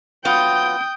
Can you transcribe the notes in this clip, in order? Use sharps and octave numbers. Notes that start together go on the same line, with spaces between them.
F#3 B3 F4 G5 D#6 G6